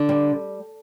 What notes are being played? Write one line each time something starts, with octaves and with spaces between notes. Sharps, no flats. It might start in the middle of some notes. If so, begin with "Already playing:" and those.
Already playing: D3
G3